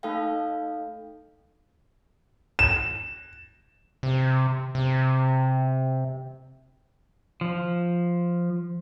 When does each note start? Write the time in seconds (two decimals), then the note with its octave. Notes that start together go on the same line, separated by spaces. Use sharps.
0.03 A3 D#4 A4 F5 G5
2.59 E7
4.03 C3
4.75 C3
7.41 F3